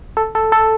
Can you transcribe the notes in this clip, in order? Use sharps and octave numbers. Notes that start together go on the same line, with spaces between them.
A4
A4
A4